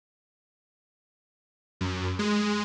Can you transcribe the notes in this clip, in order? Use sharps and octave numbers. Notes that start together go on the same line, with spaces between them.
F#2
G#3